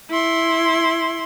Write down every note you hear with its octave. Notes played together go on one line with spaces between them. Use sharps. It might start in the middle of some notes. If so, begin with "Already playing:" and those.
E4 C6